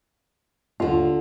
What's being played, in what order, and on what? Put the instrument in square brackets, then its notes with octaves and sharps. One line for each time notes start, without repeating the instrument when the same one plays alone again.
[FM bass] D#2 [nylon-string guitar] D3 F4